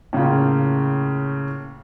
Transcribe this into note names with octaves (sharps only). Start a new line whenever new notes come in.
A2 C#3 A#3 F4